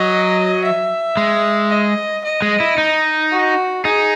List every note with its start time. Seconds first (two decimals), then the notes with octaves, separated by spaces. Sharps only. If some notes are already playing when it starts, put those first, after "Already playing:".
Already playing: F#3 D#5
0.64 E5
1.17 G#3
1.70 D#5
2.25 D#5
2.42 G#3
2.60 E4
2.78 D#4
3.31 F#4
3.85 D#4 G#4